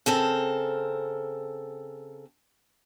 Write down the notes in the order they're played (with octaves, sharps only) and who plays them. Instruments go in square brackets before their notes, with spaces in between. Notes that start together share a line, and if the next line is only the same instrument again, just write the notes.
[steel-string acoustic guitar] C#3 C4 A4 A#4